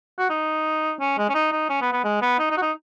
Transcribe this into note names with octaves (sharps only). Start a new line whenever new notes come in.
F#4
D#4
C#4
G#3
C#4
D#4
D#4
C#4
B3
B3
G#3
B3
D#4
D#4
F#4
D#4